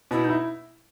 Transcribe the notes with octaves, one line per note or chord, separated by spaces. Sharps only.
B2 E4
D#4 E4